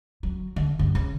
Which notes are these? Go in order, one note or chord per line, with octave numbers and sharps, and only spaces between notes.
F#3
D3
G2
C#3